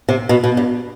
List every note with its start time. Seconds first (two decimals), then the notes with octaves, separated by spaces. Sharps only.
0.09 C3
0.29 B2
0.44 B2
0.57 G2